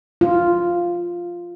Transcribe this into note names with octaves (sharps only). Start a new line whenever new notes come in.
F4